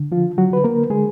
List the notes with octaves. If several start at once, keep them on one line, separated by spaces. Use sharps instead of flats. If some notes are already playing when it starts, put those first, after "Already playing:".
Already playing: D3
F3 F4
F#3 F#4
D3 B4
A#3 A#4
D3 G#3 G#4